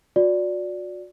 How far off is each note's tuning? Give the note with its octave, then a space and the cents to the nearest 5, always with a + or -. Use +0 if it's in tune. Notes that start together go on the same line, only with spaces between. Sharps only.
F#4 -35 D5 -10